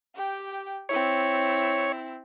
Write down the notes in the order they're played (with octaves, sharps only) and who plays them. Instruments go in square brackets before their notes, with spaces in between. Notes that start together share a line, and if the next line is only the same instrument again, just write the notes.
[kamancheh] G4 G5
[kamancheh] C4 E4 [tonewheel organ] C#5